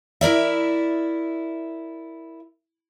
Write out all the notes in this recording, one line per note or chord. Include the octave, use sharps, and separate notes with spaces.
E4 A#4 D5 E5